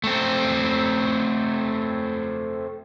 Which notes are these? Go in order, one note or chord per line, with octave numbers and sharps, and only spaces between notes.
A3 C4